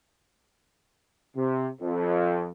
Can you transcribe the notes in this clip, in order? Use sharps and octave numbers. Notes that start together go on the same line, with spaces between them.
C3
F2